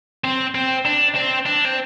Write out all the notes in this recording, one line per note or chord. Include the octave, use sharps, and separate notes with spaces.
C4
C4
D4
C4
D4
C4